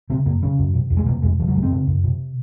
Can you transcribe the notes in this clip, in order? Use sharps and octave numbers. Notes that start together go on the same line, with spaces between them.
C#3 C4
F#2 A#3
C#3 C#4
F#2
C3
F2
G#3
C3 A#3
F2 G#3
C#3 F3
F#3
F#2 G#3
C4
C#3
F#2
C3